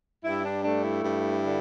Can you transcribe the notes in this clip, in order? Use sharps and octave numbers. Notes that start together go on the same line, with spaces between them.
G2 E4
D4
A3 D4
E4
G2
D3